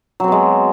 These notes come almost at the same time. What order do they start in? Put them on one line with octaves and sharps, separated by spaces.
F#3 C4 B3 G#3